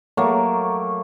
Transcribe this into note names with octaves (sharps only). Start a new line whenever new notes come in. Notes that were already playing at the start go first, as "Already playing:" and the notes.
F#3 A3 A#3